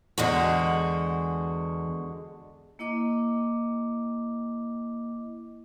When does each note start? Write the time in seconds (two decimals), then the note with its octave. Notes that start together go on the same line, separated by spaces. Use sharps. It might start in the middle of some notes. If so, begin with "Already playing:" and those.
0.18 E2 D3 G#3 F#4
2.79 A#3 E4 D#5 D6